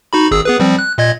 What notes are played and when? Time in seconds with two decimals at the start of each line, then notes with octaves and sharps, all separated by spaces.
0.13 D#4 F#4 B5
0.31 G#1 G#4 E6
0.45 B3 G#4 B4
0.60 F3 G3 C4
0.79 F#6
0.98 A#2 D#5 G#6